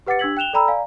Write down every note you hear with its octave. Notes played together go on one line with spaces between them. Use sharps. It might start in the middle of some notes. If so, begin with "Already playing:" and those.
G4 B4 F#5 D6 A6 C#7
D4 G4 E6 G#6 B6 F#7
G5 F#6 E7 F7 G7
A4 D5 G5 A#5 B5 E6
D5 F5 G#5 A#5